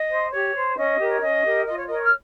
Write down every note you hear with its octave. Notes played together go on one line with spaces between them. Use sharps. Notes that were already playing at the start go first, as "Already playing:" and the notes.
Already playing: D#5
C5
G4 C#5
C5
C#4 D#5
G4 A#4
C#5
C#4 D#5
G4 A#4
F4 D#5
C#5
A#4 C#5 D#5
C#6
F6